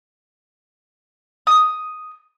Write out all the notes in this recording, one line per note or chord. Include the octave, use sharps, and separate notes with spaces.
D#6